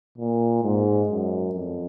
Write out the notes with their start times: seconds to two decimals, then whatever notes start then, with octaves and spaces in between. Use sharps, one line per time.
0.18 A#2
0.63 G#2
1.09 F#2
1.54 F2